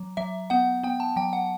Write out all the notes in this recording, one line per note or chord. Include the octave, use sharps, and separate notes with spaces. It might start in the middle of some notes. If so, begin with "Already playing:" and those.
Already playing: F#3
F#3 E5
B3 F#5
B3 G5
A5
F#3 G5
F#5